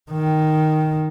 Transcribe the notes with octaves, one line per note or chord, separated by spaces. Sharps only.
D#3